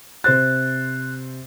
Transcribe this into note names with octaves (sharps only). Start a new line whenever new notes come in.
C3 C5 F#6 A6